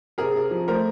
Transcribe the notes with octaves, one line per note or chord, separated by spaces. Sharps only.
C3 G#4 A#4
C3
F3
A3 A#4 C5